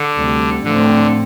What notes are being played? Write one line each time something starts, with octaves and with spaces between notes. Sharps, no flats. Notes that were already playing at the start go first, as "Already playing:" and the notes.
Already playing: D3
D2 C3 G3
A2 D3 F3 A3 C4